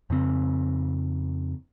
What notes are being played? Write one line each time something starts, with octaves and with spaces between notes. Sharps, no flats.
F2 C#3 C4